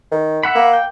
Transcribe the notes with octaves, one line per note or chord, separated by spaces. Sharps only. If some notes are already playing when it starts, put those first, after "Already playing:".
D#3
E5 F#5 B5
A#3
G5